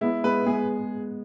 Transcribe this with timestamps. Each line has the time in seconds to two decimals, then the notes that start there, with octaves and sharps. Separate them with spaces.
0.01 G#3 B3 E4
0.24 G#3 B3 B4
0.46 G#3 B3 G#4